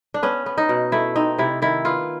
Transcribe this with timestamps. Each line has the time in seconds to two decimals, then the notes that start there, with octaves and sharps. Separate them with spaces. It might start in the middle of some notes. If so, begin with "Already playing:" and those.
0.14 D4
0.23 B3 C#4
0.46 B3
0.58 D#4
0.69 B2
0.92 A3 E4
1.16 C4 D#4
1.38 C3 E4
1.62 D#3 E4
1.85 B3 F4